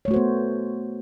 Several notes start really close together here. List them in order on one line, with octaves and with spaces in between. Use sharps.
C#5 A3 F#4 C5 B3